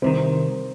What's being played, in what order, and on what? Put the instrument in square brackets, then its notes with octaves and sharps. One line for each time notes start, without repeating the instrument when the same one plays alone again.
[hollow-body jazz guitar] C2 C3 D#3 [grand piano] C4